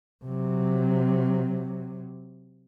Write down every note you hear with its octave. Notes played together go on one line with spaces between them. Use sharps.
C3 F#3